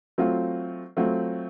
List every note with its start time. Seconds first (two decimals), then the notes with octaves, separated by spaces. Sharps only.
0.18 F#3 A3 C4 F4
0.97 F#3 A3 C4 F4